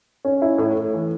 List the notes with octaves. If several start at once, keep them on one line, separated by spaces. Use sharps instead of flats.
C#4
E4
A2
A2
E3